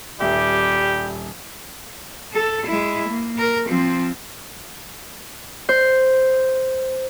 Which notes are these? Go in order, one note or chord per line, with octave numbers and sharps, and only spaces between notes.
D#1 G3 G4 E5
A4
G#3 E4
A#3
A#4
F3 C4
C5